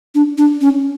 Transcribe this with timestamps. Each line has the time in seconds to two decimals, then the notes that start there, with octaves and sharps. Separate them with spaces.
0.15 D4
0.38 D4
0.61 C#4